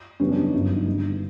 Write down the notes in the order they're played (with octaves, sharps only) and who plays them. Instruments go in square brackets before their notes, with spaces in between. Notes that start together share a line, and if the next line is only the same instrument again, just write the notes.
[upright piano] F#2 C#3 E3 G3 B3 C#4
D4
D#4
G1 F#2 C#3
D#4
G2 D3 G3 A#3